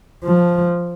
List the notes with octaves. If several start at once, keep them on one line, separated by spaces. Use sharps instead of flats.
F3